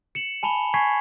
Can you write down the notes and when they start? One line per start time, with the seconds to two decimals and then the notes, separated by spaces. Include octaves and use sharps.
0.15 C#7 E7 F#7
0.43 G#5 A5 B5 F7 G7
0.74 G#5 C#6 G#6 B6 C7